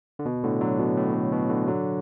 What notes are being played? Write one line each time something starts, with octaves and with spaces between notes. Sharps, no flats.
D3
B2
A2 D3
D3 F#3
B2
A2
A2
B2
A2 D3
D3 F#3